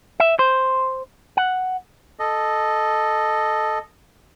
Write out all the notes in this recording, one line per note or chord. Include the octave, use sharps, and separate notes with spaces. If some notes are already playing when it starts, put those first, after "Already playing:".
E5
C5
F#5
A4 D#5